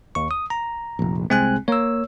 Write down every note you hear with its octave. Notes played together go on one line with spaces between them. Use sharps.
D#2 C#6
D#6
A#5
F1 A#1
C2 G#3 C4 G#5 F#6
A#3 C#5 E6